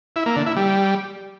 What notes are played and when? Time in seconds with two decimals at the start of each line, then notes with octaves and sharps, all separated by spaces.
0.16 E4
0.26 A#3
0.36 D3
0.46 E4
0.56 G3